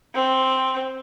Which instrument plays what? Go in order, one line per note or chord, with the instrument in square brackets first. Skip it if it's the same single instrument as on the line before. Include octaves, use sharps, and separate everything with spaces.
[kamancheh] C4